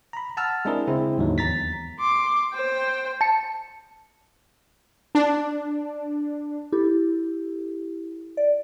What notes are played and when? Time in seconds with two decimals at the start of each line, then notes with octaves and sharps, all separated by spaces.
0.13 A#5 B5
0.37 F#5 A5 A#5 E6 F6
0.65 G#3 C4 D4 E4 G#4 A#4
0.88 C#3 G#3 C4 E4
1.18 D#2 G#2 D3 F#3
1.38 E2 A#5 A6 B6
2.00 C6 D6
2.54 C5 G5
3.21 A5 C#7
5.15 D4
6.72 E4 G4 A4
8.37 D5